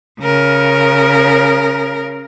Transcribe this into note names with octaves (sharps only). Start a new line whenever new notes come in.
C#3 A#4